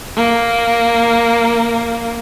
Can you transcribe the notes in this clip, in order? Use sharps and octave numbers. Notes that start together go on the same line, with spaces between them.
A#3